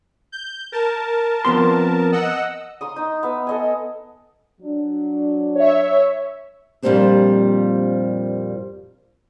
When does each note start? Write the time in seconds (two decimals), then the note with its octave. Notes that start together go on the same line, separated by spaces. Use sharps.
0.32 G6
0.72 A#4 A5
1.45 F2 B3 C6
2.12 D#5 F#5 E6
2.81 A#5 C6 D#6
2.96 D#4
3.23 B3 E5
3.47 A4 D#5 G#5
4.61 F#3 D4
5.55 C#5 E5
6.83 F2 A#2 G3 A#3 C4 D4